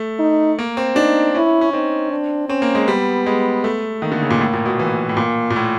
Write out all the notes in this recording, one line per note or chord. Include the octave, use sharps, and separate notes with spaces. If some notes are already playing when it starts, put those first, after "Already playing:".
Already playing: A3
D#4
A#3
C4
D4 D#4
C#4 E4
C#4
C4 D#4
D4
C4 C#4
A#3
G#3
G3 B3
G#3
A3
D#3 A#3
D3
C#3
A#2
A2
A#2
B2
E3
A2
A#2 A#3
A#2
A2